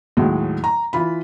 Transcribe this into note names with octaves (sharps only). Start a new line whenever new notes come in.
D#2 A2 F#3 G#3
A#5
E3 F4 B5